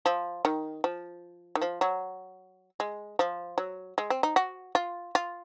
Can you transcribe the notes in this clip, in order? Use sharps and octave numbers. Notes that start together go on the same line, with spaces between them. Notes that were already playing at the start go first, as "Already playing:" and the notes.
F3
D#3
F3
D#3
F3
F#3
G#3
F3
F#3
G#3
C4
D#4
F#4
F4
F4